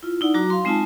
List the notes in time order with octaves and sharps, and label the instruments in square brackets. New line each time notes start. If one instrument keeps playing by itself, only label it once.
[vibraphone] E4 F4
D#4 E4 D5 F#5
F#3 F#4 A#5 D6
F5 C6
G#3 C4 D#4 F4 G#5 A5